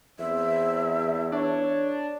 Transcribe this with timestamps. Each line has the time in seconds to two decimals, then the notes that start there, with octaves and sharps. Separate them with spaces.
0.19 E2 C4 E5
1.32 D4 C#5